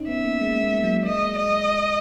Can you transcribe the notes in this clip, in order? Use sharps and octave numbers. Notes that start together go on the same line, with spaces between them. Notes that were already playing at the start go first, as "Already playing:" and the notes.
Already playing: C#4 D#4
B3 E5
A#3
G#3
A#3
G#3
F#3
A#3
G#3 D#5
D#5